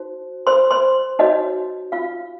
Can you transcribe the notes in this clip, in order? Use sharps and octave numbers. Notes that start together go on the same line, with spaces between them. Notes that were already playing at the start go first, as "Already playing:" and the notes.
Already playing: D#4 F#4 C5
C5 C6
C5 C6
D#4 F#4 C#5 D#5
F4 F5